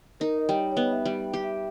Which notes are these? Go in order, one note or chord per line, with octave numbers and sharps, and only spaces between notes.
D#4 A#4
D#5
G3 C#5
C#5
B3 D#5
E5
G3 G5
E5
G4 G5
E5